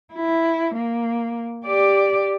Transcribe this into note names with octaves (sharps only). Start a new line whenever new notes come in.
E4
A#3
G4 D5